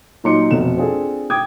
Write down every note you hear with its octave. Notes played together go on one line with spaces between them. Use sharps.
A#2 F#3 D#4 C6 D6 C#7
F1 F2 B2 E7
C4 D4 F4 G#4 A4
G5 D6 D#6 G#6